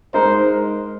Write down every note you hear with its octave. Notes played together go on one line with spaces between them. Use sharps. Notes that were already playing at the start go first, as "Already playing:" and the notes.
G#3 D#4 A#4 C5